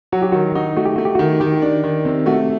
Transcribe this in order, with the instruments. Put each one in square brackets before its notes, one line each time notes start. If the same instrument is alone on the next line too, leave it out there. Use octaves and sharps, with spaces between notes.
[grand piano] F#3 [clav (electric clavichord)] F#4
[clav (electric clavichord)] G4
[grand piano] D#3 [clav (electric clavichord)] F#4
[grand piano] D#4 [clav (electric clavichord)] F#4
[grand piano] A3 [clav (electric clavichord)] F#4
[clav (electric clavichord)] G4
[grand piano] A3 [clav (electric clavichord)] F#4
[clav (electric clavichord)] G4
[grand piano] D#3 [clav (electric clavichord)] F#4
[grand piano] D#3 [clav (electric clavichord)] G4
[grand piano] D4
D#3
C3
[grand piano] A3 [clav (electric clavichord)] F#4